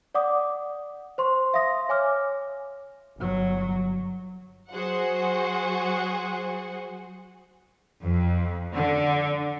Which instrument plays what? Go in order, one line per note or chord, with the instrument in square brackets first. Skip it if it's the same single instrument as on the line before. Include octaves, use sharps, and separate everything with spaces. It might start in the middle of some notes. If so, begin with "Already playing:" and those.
[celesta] D5 F#5 D6 D#6
C5 C6 C#6
E5 F5 C6 D#6 A#6
C#5 G#5 D6 F6
[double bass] G1 F#3
[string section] F#3 F#4 G#4 C5 F#5
F2
D3